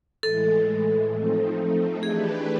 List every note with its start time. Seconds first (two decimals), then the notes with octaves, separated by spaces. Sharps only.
0.23 A2 E3 G#3 A4
1.13 F3 A3 C4 D#4
2.03 E3 A3 D4 G4 G#4 B4